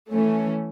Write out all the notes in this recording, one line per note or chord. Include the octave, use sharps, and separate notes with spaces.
E3 A3 C#4